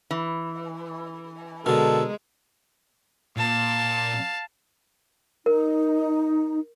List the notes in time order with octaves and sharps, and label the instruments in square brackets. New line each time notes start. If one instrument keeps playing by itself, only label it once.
[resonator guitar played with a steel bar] E3
[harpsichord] B2 D3 [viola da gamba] G#3 [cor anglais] A4 [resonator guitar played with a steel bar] A#4
[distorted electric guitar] A#2 [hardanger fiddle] F5 A5
[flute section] D#4 [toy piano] A#4